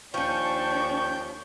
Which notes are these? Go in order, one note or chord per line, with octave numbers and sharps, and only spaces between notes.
D#2 F3 C#4 D4 G5 C#6 G6